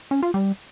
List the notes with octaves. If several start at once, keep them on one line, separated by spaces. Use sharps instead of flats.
C#4
F4
G3